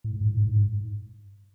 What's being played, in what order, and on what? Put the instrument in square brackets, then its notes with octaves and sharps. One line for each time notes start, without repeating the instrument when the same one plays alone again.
[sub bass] A2
G#2
A2
G#2
G#2